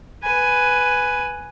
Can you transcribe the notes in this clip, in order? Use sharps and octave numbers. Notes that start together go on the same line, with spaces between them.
B4 G#5